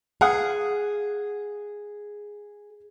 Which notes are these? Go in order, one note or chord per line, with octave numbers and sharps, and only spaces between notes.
G#4 F5 F#5 D#6